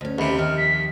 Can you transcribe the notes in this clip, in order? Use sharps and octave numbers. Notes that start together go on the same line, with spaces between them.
D2 C#4
D#2 C3 B5
F2 D#3 F6
B6